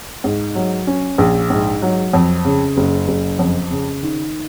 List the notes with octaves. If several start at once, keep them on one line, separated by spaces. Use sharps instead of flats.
G#2
F#3
C#4
A#1
G#2
F#3
F2
C#3
F#1
F#1
F2
C#3
D#3